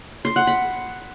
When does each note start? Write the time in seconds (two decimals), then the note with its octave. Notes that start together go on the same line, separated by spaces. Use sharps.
0.25 C6
0.36 F#5
0.47 B5